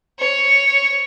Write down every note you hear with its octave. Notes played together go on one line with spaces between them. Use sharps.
C#5